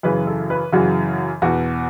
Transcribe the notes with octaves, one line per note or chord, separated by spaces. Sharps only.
F#2 C#3 E3 B4
A4
B4
F#2 C#3 E3 F#4
E2 B2 F#4